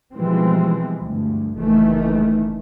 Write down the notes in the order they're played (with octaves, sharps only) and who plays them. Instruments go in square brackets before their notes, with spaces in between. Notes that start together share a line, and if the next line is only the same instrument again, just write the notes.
[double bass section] B2 E3 F3 G3 G#3 C4
D2 G2
F#1 D#3 E3 A3 A#3